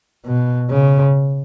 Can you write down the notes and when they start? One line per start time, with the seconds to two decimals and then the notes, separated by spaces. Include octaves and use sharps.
0.25 B2
0.70 C#3